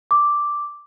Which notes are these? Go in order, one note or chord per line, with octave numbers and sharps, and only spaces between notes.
D6